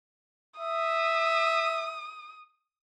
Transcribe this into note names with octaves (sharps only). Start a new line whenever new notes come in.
E5 D#6